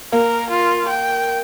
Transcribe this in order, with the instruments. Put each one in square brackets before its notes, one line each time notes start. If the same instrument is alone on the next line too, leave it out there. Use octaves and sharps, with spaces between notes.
[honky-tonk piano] A#3 [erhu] A#4
[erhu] F4
G5